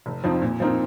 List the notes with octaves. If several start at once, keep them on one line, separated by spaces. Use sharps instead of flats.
F1
F2 F3 C4 D#4
A#2
F3 C4 D#4 A#4